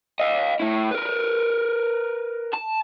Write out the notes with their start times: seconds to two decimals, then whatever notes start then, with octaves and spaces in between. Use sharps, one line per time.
0.20 D#5 F5
0.60 A2 E4
0.92 A#4 B4
2.54 A5